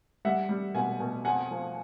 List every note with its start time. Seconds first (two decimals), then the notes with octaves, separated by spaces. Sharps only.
0.25 G3 E5 F#5
0.49 G3
0.74 B2 F#5 G#5
1.00 B2
1.25 F2 F#5 G#5
1.51 F3